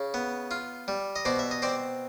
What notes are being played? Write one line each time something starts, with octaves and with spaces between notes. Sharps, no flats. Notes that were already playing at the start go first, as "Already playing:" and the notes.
Already playing: C#3
B3
F4
G3
D#5
B2 C5 D5
E5
D#5
C4 C5 D5